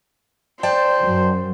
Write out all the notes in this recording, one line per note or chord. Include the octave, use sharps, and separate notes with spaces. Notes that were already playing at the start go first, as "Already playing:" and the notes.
C5 D5 G5 A5
F#2